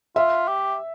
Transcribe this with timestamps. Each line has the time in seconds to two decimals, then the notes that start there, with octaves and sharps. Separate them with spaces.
0.16 F4 E5
0.48 G4